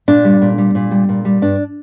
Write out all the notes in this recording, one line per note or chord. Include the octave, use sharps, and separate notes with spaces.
A#2 D4
G3
A#2
G3
A#2
G3
A#2
G3
G2 D4